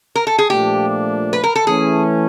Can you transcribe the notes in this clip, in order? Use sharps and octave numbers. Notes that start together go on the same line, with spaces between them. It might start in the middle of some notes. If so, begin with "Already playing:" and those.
A#4
A4
G#4
A#2 F3 A3 D4 G4
B4
A#4
A4
E3 A3 C#4 G#4